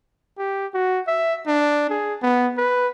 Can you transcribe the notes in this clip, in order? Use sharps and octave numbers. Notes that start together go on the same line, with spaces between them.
G4
F#4
E5
D4
G#4
B3
B4